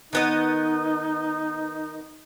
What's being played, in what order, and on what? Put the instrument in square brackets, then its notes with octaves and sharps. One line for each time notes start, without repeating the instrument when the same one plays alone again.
[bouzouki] D#3 B3 D#5 [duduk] D#4